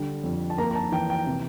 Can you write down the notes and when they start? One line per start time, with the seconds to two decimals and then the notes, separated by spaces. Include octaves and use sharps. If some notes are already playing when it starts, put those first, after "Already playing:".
Already playing: D3 G3
0.24 F2
0.50 A5
0.58 A#3 A#5
0.71 A#5
0.75 A5
0.92 E3 G5
1.10 G5
1.27 C3